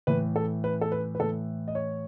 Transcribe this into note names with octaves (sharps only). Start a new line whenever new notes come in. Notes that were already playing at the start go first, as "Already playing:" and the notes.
A2 E3 B4
A4
B4
A4
B4
B4
A2 E3 A4
D#5
C#5